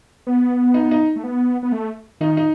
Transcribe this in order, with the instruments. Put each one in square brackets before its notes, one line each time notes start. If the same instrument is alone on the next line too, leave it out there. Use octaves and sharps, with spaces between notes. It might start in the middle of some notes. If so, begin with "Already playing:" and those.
[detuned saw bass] B3
[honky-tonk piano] D#4
D#4
[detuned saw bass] A3
B3
B3
A3
[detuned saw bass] D#3 [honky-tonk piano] D#4
[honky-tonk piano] D#4